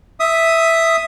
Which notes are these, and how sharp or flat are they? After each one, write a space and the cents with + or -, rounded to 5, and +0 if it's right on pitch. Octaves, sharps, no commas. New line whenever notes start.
E5 +0 D#6 +10